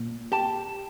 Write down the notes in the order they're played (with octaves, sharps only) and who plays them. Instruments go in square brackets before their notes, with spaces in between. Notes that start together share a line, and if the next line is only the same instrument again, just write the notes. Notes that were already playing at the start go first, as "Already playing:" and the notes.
Already playing: [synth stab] A#2
[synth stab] G4 [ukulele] A5